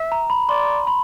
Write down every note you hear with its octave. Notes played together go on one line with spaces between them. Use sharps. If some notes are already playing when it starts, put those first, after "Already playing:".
Already playing: E5
A#5
B5
D5 C6
B5